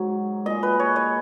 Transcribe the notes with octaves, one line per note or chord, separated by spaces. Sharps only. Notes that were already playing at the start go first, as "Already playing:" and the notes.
Already playing: G#2 F#3
A#2 G#3 D#5
B4
C#5
C#5